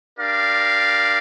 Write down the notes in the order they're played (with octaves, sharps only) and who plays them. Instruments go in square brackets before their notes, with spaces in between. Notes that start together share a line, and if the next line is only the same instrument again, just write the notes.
[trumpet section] D4 G4 A#4 D5 F5